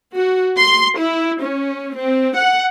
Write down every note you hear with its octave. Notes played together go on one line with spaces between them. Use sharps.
F#4
C6
E4
C#4
C4
F#5